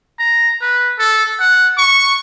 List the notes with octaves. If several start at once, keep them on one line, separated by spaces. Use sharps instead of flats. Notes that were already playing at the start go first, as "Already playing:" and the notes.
A#5
B4
A4
F#5
C#6